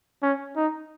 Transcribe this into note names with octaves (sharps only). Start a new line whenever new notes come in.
C#4
D#4